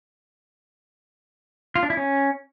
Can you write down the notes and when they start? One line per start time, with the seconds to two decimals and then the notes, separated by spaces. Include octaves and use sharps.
1.76 F4
1.83 D4
1.90 E4
1.97 C#4